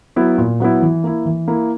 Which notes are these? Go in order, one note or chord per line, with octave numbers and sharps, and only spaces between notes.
F#3 B3 E4
A#2
F#3 B3 E4
E3
A#3 E4
E3
A#3 E4